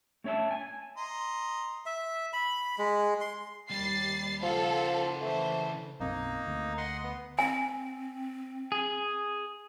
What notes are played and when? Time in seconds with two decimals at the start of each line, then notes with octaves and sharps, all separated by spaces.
0.24 A3 C#4 C#5 E5 A5
0.51 G#5
0.97 D#5 A#5 C6
1.86 E5
2.33 B5
2.78 G#3
3.21 C6
3.70 D#2 G3 A6 C7
4.43 C#3 F3 A4 F5 F#5
5.22 E3 A3 C5
6.00 B1 F#2 A#3 C4 D#4
6.47 D2
6.78 D#5 F#5 C6
7.04 B3
7.39 C4 G#5
8.72 G#4